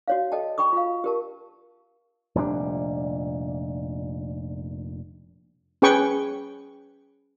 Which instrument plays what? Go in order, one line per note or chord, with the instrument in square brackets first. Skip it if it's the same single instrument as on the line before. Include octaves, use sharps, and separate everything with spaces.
[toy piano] F#4 C#5 F5
A4 D#5 G5 A5
G5 B5 C#6 D#6
F4 F5
G4 A#4 A5
[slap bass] F1 A#2 G3 D4
[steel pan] C#4 G#4 B4 G5 C#6